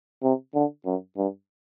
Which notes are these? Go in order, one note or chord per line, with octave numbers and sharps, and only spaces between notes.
C3
D3
F#2
G2